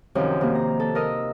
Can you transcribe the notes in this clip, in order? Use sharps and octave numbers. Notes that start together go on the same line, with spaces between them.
F#2 C3 D#3 F3
C3 A#3
A#5
A4
A#4 D#5 E6